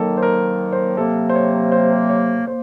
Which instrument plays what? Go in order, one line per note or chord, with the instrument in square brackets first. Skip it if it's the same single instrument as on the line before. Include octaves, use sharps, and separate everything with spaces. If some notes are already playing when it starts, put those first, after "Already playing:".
Already playing: [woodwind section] D#3 F#3 A#3 [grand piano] A4
[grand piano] C5
A#4
C5
[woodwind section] C3 F#3 A#3 [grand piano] A4
[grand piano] C5
C#5
C5
C#5
[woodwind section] A#3 [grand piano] C5